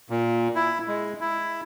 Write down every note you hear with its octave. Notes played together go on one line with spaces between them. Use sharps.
A#2
E4
G#3
E4